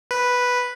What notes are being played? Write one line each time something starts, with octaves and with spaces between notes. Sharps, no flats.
B4